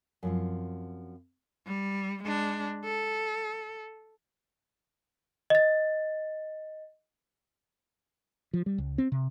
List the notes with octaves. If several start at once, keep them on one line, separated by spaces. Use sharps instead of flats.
F#2 F3 C4
G3
G#3 D4
A4
D#5 A6
F3
G3
C#2
C4
C3